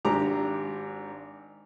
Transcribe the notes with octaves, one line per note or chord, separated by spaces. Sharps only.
G#1 D4 G4 A#5 D6